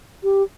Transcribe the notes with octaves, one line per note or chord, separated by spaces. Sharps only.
G4